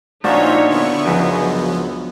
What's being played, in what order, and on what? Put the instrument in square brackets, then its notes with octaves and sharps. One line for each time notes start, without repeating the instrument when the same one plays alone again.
[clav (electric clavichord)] A#2 F3 [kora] D4 F#4 [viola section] D#4 C#5 [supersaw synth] F4 E5
[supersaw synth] D3 E4 C#6 [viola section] B3
[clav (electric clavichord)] C#2 F#2 [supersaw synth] F3 F#3